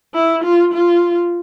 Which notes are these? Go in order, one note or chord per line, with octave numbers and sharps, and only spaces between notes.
E4
F4
F4